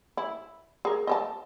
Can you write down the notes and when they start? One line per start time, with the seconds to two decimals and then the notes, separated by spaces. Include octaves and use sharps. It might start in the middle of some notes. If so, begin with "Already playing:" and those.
0.17 E4
0.85 G#4 A#4
1.07 D#5 E5 A5